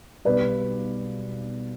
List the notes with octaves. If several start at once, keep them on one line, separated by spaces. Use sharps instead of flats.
B1 B2 G3 B4 D5